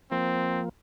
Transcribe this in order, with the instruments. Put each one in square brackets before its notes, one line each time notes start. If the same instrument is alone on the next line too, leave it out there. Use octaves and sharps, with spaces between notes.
[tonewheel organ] F3 A#3 [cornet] C4